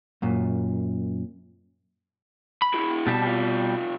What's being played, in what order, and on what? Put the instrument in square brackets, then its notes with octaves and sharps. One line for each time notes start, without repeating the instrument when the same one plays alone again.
[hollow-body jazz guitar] F#2 A#2
[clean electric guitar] B5
[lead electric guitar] E4 F#4
[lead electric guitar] E2 A5 [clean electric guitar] B2 G3
[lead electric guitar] C3 F4